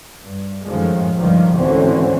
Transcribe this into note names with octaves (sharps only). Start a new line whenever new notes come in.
G2
F#2 A2 D#3 F3 G#3
C#2 G2 D#3 F3 G3
G#1 D2 D3 E3 C4 C#4